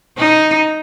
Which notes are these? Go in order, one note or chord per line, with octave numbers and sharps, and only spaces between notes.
D#4